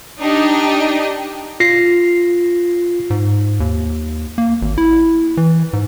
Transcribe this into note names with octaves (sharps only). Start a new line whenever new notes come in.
D4 D#4 G4 D#5
F4 A#6 C7
G#2
D#2
A#3
G#1
E4
E3
G#2